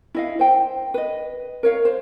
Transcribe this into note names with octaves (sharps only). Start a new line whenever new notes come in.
E4 D#5 F5
C5 G5
B4 D#5
A#4 C#5 F5
C5